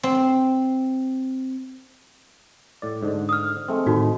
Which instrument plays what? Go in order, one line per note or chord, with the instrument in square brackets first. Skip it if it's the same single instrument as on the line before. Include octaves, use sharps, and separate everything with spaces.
[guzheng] C4
[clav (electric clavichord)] A2 D5
G#2 D3
[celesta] D#6 F6
[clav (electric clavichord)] G#3 A3 C4
[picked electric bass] A2 D#3 [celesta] D#4 F#4